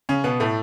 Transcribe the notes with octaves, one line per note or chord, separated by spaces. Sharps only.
C#3 C#4
B2 B3
A2 A3